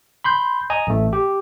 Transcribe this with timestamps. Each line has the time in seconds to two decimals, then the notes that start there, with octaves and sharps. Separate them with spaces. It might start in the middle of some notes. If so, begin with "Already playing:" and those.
0.24 B5 C6 G6
0.70 D#5 G#5 A#5
0.87 A1 A3
1.13 G4